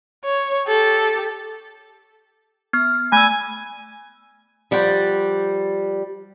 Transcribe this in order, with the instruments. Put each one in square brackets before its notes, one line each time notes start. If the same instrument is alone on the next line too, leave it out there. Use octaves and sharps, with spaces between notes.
[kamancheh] C#5
G4 A4
[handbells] B3 F6
[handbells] A3 E6 [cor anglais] G#5
[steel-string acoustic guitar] F3 G3 F#5 G5